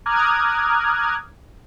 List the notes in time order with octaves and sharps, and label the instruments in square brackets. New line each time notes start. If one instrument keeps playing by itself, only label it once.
[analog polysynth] A#5 D6 D#6 F6 F#6 G#6